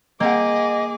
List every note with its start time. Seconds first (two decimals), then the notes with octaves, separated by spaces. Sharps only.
0.20 A#3 C4 G#4 D#5 F5 F#5 D6